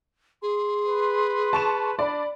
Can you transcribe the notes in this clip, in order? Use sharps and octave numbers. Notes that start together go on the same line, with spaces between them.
G#4 C6
B4
A5 C#6 E7
D4 D5 B5